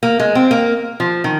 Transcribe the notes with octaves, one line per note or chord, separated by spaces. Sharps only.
A#3
G#3
C4
A#3
F3
D#3